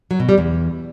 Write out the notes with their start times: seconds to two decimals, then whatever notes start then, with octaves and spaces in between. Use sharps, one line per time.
0.11 F#3
0.20 B2
0.29 G3
0.38 E2